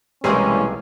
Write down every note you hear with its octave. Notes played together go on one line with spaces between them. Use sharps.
B1 C3 E3 G3 G#3 A#3 C#4 G#4